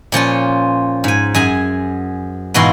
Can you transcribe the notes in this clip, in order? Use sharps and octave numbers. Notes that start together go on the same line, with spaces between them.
A#2 F3 C#4 F4
G#2 G#5
F#2 G#4 G#5
G#2 B2 E3 F#4 F5 C6